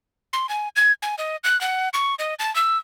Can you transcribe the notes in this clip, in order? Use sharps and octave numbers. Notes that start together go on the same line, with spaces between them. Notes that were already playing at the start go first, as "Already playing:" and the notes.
C6
G#5
G#6
G#5
D#5
F#6
F#5
C#6
D#5
A5
E6